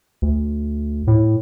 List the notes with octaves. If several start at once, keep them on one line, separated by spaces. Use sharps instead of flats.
D2
A2